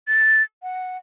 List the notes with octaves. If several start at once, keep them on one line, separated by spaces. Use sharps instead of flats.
A6
F#5